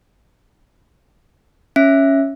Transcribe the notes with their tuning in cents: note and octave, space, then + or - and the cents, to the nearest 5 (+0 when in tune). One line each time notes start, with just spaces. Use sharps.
C#4 +0 E5 +0